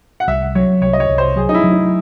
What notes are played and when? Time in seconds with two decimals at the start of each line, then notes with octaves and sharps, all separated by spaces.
0.20 F#5
0.27 C2 E5
0.55 F#3 C#5
0.82 C2 C#5
0.93 D#5
1.00 C#5
1.09 C2
1.18 C5
1.36 F#3 G#4
1.49 D#4
1.54 E4
1.64 F#3
1.72 D#4